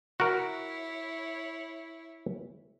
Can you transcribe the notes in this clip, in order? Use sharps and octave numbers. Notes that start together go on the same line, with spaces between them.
E4 F#4 A#4 C#5